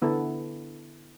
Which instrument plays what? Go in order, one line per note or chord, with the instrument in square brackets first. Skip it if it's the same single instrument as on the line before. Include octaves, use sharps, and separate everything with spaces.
[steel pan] D3 B3 E4 A4